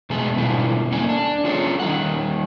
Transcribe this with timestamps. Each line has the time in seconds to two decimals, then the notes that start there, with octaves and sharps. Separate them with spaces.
0.10 B2 G#3 A3 B3 G#4 A4
0.36 B2 D3 G3 E4 F4
0.92 A#3 C#4 A4 D5 G#5
1.09 D4
1.44 C#4 F4 G#4 A4 C#5
1.80 D#3 G3 F#5